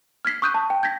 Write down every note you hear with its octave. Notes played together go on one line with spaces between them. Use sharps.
F6 G#6 B6 C7
C#6 D#6 F#6 G6 D#7
A5
G5
G6 G#6 A#6 B6